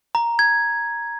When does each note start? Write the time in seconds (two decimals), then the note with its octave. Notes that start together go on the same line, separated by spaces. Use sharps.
0.15 A#5
0.39 G#6